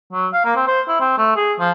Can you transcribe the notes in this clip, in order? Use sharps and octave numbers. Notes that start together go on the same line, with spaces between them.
F#3
F5
A#3
C4
C5
E4
C4
A3
G#4
F3